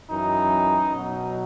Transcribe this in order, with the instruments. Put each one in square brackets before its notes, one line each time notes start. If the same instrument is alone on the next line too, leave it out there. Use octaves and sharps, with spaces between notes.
[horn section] F#2 E3 D#4
B2 F#3